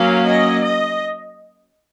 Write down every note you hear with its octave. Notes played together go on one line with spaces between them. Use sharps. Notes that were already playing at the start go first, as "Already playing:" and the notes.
Already playing: F#3 A#3 C#4 F5
D#5
D#5